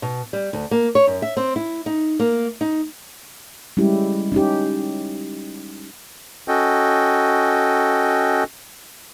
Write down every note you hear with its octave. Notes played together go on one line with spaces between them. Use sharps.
B2
G3
D2
A#3
C#5
F#2
E5
C4
E4
D#4
A#3
D#4
G3 G#3 C#4 E4 G4
C#4 D#4 G4
C#4 F#4 A4 D#5 G5